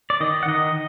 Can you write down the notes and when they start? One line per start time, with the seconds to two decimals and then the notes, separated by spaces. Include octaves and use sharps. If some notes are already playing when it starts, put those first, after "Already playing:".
0.10 D5
0.20 D#3 D#5
0.43 F#5
0.48 D#3 D#5